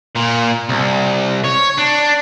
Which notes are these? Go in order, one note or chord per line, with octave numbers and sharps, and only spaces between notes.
A#2
C2
C#5
D4